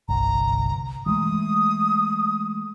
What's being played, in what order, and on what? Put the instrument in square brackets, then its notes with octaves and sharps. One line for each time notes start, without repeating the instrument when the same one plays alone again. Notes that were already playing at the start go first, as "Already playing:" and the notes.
[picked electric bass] G1 C2 [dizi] A#5
[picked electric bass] E3 G#3 A3 [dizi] D#6